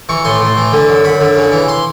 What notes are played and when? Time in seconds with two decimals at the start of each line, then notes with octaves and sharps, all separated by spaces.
0.09 E3 C#6
0.25 A2 C6
0.41 A2
0.57 E3
0.73 D3
0.89 F#2
1.04 F#2 B5
1.21 D3
1.37 C#3
1.52 E3
1.68 C6